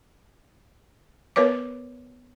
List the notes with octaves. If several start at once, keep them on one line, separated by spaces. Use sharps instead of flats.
B3 A#4 B4 C#5 D6